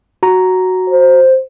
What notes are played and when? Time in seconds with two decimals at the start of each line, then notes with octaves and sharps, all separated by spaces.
0.23 F#4 A#5
0.89 C5